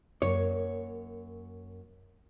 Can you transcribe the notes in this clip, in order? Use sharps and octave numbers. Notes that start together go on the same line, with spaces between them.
F#2 A#3 C#5